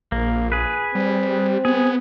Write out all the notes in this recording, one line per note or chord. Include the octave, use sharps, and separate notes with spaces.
A#1 A#3
G#4 B4
G3 C4
B3 G#4